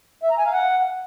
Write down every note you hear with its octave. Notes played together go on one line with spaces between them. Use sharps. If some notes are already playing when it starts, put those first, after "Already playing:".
E5
A#5
G#5
F5
F#5